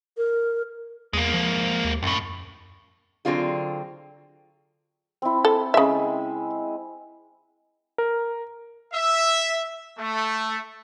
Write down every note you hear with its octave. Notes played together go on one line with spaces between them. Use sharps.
A#4
E2 G#3 A#3
F3
D#2
C#2 F#2 A2
D3 F#3 C4 F4 G#4
C4 E4
A4
C#3 G#3 E5
A#4
E5
A3